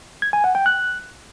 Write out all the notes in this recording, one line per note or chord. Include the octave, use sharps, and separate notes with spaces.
G#6
G#5
F#5
G5
F#6